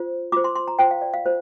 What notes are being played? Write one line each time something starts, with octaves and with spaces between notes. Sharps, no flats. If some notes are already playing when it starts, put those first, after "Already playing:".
Already playing: F4 C5
F4 C5 D6
C6
C6
A#5
F4 C5 G5
F5
D5
F5
F4 C5